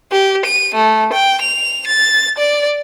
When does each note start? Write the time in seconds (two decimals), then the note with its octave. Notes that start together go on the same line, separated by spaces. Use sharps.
0.12 G4
0.46 D#7
0.75 A3
1.13 G5
1.42 F7
1.87 A6
2.38 D5